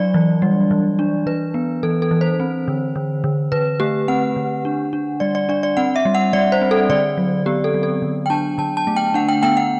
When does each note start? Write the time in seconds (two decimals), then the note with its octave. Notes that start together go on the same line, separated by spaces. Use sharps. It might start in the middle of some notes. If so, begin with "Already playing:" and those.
Already playing: F#3 D4 D5
0.14 E3
0.42 G3
0.71 E3
0.99 D4
1.26 E3 B4
1.54 B3
1.83 E3 A4
2.02 A4
2.11 E3
2.21 C5
2.40 C4
2.68 D3
2.96 D3
3.24 D3
3.52 D3 B4
3.80 A3 G4
4.08 C4 F#5
4.36 D3
4.65 D4
4.93 D4
5.20 G3 D5
5.35 D5
5.49 D4 D5
5.63 D5
5.77 C4 F#5
5.96 E5
6.05 G3
6.15 F#5
6.33 G3 D5
6.52 C5
6.62 C4
6.71 A4
6.89 D3 D5
7.18 F#3
7.46 B3 G4
7.64 A4
7.74 F#3
7.83 A4
8.02 D3
8.26 G5
8.30 D4 A5
8.58 D3 A5
8.77 A5
8.87 A3
8.96 G5
9.14 D4 F#5
9.28 G5
9.43 B3 G5
9.57 F#5